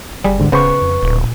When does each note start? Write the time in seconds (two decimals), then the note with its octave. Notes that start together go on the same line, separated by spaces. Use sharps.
0.24 F#1 G3 G#4
0.39 D2 G#2 D3
0.52 D1 C#3 B3 B4 C5 C#6
0.82 F2
1.03 D1 A#2